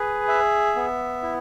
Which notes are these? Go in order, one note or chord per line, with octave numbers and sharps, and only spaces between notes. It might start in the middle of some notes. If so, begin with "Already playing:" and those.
Already playing: G#4 B4
E5
B3
E4